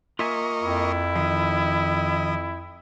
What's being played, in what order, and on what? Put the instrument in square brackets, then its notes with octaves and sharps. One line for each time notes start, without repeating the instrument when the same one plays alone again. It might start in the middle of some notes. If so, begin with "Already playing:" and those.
[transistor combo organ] A#3 D#5 C#6 [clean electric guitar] F4 E5 G#5
[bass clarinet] F2 [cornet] E4
[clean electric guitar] D#3 F3 [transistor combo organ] D#5